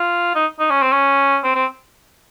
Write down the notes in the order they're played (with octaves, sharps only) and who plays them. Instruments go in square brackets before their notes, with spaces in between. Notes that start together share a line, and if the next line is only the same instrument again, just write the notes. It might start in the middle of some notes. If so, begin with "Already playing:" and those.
Already playing: [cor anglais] F4
D#4
D#4
C#4
C4
C#4
C4
C4